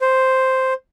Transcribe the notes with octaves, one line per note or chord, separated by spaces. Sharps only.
C5